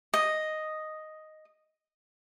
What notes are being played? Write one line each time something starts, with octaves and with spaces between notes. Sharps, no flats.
D#5